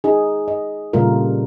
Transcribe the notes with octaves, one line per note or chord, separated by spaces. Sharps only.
D#4 G#4
D#5
A#2 C#3 G3 A3 F4 A#4